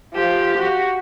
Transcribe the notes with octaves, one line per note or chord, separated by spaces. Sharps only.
F3 G4
F#4